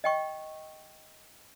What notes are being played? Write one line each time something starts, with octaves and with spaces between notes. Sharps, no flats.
D#5 G5 C#6